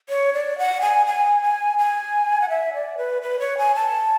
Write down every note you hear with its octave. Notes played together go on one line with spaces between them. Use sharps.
C#5
D5
F#5
G#5
G#5
G#5
G#5
F#5
E5
D5
B4
B4
C#5
G#5
A5